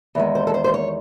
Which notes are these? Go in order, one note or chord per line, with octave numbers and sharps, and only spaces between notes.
E2 D#3 G#3
C5
A4
C5
C5
C#5